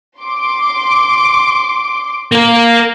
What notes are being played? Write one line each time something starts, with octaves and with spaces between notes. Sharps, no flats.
C6 D6
A#3 A#4